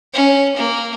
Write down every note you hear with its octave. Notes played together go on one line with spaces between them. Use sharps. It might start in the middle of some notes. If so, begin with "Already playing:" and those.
C#4
A#3